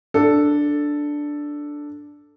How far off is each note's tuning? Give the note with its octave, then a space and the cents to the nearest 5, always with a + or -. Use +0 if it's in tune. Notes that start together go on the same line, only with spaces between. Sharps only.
D4 +0 A4 +0